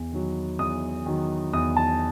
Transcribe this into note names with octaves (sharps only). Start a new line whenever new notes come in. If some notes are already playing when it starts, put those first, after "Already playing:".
Already playing: E2
D#3 F#3
E2 D#6
D#3 F#3
E2 D#6
A5